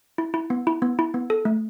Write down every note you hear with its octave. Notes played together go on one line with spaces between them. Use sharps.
E4
E4
B3
E4
B3
E4
B3
A4
A3